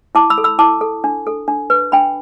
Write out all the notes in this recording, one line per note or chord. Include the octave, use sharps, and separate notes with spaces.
E4 A5 D6
B5 E6
A4
B5 E6
E4 A5 D6
A4
D4
A4
D4
B4
D4 G5 B5